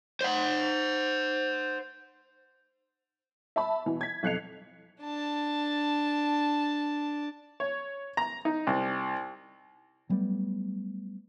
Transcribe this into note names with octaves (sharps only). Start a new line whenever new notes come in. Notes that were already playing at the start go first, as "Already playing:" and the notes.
C5 F#5
E5 A5 B5
B2 E3
G#6 B6
B1 F2 F#6 C7 C#7 F7
D4 A5
C#5
A#5
D#4
C2
F#3 G3 A3 B3